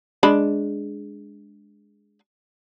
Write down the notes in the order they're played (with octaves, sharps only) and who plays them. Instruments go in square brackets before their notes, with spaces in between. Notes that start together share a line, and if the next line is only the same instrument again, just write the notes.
[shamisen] G#3 D4 B5